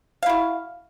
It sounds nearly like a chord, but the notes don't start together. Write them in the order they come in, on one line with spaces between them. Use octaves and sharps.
F5 E4 F#4